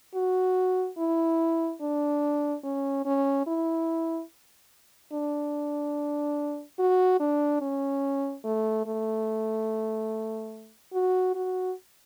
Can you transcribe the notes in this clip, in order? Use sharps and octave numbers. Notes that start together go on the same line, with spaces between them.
F#4
E4
D4
C#4
C#4
E4
D4
F#4
D4
C#4
A3
A3
F#4
F#4